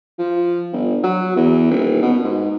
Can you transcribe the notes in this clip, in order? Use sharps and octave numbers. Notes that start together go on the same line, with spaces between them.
F3
G1
F#3
E2
D#1
B2
G#2